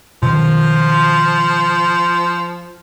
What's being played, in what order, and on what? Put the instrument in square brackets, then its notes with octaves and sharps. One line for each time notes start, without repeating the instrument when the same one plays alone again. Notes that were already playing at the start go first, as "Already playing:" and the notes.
[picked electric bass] B2 D#3 [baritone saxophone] F3